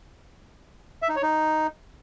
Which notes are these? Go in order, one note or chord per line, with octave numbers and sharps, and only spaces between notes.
E5
D#4
C#5
D#4